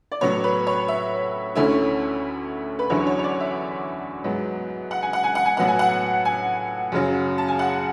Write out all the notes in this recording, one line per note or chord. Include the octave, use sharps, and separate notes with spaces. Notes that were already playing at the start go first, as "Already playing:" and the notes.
D5
A2 F#3 B3 C#5
B4
C#5
E5
D2 D3 A3 C#4 E4
B4
E2 D3 F#3 C#4 E4 C#5
C#5
C#5
D5
E5
G#2 F#3 B3
F#5
G#5
F#5
G#5
F#5
G#5
A2 F#3 B3 F#5
G#5
F#5
G#5
F#2 C#3 F#3
A5
G#5
F#5